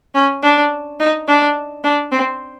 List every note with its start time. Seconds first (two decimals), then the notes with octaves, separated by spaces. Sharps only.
0.15 C#4
0.43 D4
1.00 D#4
1.28 D4
1.84 D4
2.12 C4